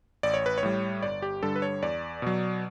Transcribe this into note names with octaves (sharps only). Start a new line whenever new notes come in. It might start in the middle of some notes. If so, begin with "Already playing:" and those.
A1 D5
C#5
B4
C#5
A2 G3
G1 D5
G4
G2 D3 G3 A4
B4
C#5
E2 D5
B2 F#3